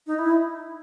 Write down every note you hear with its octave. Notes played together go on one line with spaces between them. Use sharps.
D#4
E4